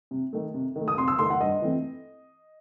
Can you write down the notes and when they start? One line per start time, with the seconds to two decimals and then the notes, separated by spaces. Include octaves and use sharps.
0.11 C3
0.33 D#3 A3
0.54 C3
0.76 D#3
0.81 A3
0.88 D#6
0.97 C3 C6
1.08 E6
1.18 D#3 A3 C6
1.30 F#5
1.41 G2 D#5
1.62 E3 A3 C4